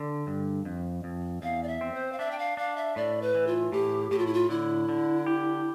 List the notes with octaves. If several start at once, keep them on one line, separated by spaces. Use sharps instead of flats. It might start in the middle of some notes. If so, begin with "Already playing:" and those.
Already playing: D3
G2
F2
F2
E2 F5
D5
E5
C4
C5
F5
D4 E5
G5
F5
D4 F5
E5
A2 D5
B4
E3
F4
A2 G4
A2 G4
F4
E4
F4
D3 E4
D3
G4